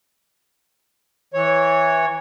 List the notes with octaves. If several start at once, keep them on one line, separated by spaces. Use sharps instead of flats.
E3 C#5